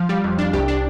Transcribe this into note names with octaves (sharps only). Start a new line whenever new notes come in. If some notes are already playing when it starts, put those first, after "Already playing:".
Already playing: F3 F5
G3
F2
D4
C2 G4
D4